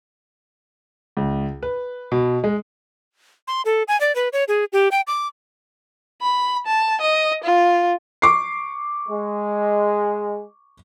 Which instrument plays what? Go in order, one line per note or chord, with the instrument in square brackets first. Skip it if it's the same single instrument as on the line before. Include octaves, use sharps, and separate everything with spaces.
[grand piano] C#2
B4
B2
G#3
[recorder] C6
A4
G#5
D5
B4
C#5
G#4
G4
G5
D6
[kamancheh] B5
A5
D#5
F4
[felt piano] C#6 D6 C7
[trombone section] G#3